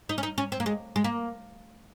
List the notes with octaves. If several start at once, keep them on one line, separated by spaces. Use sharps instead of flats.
D#4
C#4
D#4
C#4
C4
A#3
G#3
G#3
A#3